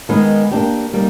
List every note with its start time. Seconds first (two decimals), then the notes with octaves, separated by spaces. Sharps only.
0.09 D#3 G#3 B3 D#4 G#4
0.51 A#3 D4 G4
0.93 G3 A#3 D#4